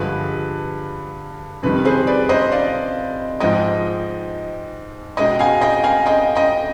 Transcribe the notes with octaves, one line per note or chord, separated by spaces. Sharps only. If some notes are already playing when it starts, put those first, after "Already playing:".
Already playing: G2 D3 F3 G#3 B4
F2 C3 D#3 G3 B4
G#4 C5
B4 D5
C5 D#5
D5 F5
G#2 F3 G#3 D#5 G5
B2 G#3 D#5 G5
F5 G#5
D#5 G5
F5 G#5
D#5 G5
D#5 G5